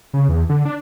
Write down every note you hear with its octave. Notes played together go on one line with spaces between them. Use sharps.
C#3
E2
D3
D4